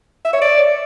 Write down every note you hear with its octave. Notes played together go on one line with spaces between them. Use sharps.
E5
C#5
D5